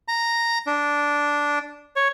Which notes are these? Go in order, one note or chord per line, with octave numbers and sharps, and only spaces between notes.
A#5
D4
C#5